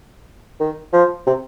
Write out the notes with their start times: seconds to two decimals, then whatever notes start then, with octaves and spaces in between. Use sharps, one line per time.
0.60 D#3
0.93 F3
1.27 C3